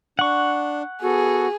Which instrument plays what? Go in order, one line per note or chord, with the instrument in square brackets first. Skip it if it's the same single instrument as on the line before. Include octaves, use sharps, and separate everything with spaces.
[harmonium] D4 [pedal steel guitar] F#5 C#6
[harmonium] B3 A4 [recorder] F#4 [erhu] G#4